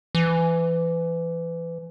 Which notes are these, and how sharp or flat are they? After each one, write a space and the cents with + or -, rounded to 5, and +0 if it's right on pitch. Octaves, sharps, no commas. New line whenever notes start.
E3 +25